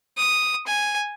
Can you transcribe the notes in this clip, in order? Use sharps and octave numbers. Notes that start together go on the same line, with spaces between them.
D#6
G#5